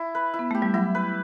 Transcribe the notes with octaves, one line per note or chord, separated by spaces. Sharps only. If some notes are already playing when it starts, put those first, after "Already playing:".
Already playing: E4
B4
E4
B3
A3 G4
G3
F#3 E4
B4